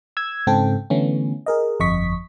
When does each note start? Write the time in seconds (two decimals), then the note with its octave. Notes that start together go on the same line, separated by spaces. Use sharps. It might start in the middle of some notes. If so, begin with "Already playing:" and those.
0.17 E6 G#6
0.47 G#2 C#3 C4 A4 G5
0.90 D3 E3 A3 B3 C#4
1.46 G#4 A#4 D#5
1.80 G1 F2 D#5 C#6 B6